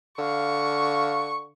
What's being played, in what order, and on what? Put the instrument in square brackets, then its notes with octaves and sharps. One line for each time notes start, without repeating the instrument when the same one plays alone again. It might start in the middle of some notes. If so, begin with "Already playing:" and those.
[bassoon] D3 [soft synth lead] F5 [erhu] C#6